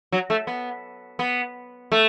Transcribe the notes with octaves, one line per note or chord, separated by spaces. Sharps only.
F#3
A3
B3
B3
A3